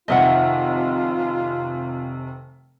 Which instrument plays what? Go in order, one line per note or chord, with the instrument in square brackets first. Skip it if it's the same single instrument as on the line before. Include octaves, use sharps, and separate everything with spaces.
[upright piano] F1 C3 D#3 [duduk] F4 [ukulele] D#5 E5 F#5